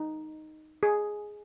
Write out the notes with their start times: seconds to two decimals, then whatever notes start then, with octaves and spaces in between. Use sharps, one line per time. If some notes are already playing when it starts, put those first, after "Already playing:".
Already playing: D#4
0.83 G#4